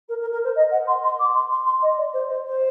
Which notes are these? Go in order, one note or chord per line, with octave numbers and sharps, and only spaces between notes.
A#4
A#4
A#4
C5
D#5
F#5
C6
C6
D6
C6
C6
C6
D#5
D5
C5
C5
C5